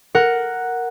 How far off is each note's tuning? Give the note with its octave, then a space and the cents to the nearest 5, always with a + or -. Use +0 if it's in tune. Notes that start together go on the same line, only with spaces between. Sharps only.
A#4 +0 F#5 +0